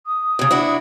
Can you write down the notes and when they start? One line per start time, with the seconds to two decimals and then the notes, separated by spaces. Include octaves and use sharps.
0.06 D#6
0.39 D#2 C#3
0.51 D4 E4 F#4